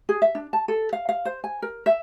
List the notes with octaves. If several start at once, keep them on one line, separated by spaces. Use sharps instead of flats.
G#4
E5
D4
A5
A4
F5
F5
C5
G#5
A#4
E5